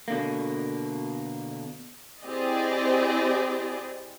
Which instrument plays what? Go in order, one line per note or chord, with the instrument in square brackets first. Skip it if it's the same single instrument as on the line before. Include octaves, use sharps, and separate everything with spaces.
[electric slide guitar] B2 D3 A#3
[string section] C4 E4 G4 G#4 D5 D#5